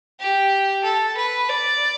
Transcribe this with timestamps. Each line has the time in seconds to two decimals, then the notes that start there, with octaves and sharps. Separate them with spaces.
0.20 G4
0.83 A4
1.17 B4
1.49 D5